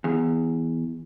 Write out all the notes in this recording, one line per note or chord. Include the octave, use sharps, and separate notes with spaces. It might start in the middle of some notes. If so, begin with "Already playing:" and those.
E2